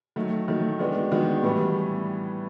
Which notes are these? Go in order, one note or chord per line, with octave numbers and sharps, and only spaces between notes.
D#3 F#3 A3
D#3 F#3 A3
D#3 G#3 B3 D4 F#4
D#3 G#3 B3 D4 F#4
A2 E3 G3 B3